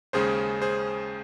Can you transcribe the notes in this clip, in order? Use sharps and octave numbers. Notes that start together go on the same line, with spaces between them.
D#2 C#3 G#3 C#4 G#4 C5
G#4 C5